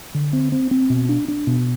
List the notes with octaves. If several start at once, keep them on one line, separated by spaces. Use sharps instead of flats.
D3
C4
C4
C4
B2
D4
D4
B2